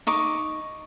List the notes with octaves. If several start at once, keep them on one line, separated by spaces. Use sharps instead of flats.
D#4 C#6 D6